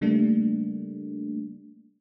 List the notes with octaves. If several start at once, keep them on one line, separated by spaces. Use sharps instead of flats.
C#3 G3 A3 A#3 D4